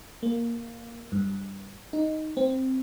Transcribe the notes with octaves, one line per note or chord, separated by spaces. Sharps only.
A#3
G2
D#4
C4